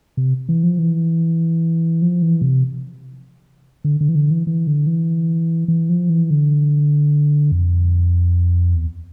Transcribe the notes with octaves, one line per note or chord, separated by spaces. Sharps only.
C3
E3
F3
E3
F3
E3
C3
D3
D3
E3
D3
E3
E3
D3
E3
E3
F3
E3
D3
F2
E2